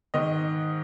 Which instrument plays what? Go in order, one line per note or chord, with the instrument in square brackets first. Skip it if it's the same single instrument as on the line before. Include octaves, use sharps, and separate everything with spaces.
[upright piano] G#2 D#3 D#5